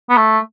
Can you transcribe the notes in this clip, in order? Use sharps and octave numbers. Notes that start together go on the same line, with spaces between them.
B3
A3